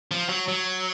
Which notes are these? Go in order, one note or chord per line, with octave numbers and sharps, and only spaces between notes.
F3
F#3
F#3